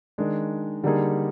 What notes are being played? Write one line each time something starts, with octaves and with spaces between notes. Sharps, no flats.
D#3 G#3 D4
D3 G3 A#3 D#4 G#4